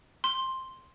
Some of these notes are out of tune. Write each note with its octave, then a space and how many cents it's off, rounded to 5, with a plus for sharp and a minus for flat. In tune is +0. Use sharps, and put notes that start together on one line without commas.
C6 +5